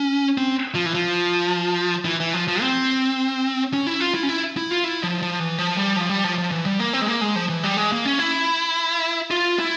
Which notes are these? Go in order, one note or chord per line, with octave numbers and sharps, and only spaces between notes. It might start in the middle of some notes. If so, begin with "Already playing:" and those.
Already playing: C#4
C4
F3
E3
F3
E3
E3
F3
F3
C4
C#4
E4
F4
E4
C#4
E4
E4
F4
E4
F3
F3
E3
F3
G3
F3
G3
F3
F3
E3
G3
A#3
C4
G#3
A#3
G#3
F3
E3
G3
G#3
A#3
C#4
E4
F4
E4